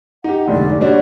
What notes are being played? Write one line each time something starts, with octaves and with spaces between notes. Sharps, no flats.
D#4 G4 F#5
F1 D2 G#2 D5
G3 D4 F#4 C#5